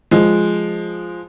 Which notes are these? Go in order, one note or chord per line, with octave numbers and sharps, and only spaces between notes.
F3 G#3